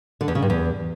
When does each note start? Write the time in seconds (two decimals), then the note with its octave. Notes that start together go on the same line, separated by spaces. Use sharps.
0.21 D3
0.28 E2
0.35 C#3
0.42 G2
0.50 E2